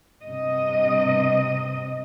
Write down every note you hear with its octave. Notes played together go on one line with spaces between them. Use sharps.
G2 C3 D#5